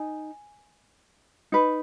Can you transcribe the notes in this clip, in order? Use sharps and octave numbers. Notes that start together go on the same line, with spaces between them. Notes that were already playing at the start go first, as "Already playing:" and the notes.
Already playing: D#4 G#5
D#4 B4